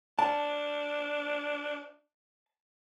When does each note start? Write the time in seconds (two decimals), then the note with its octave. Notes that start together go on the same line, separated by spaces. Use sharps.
0.19 D4 A5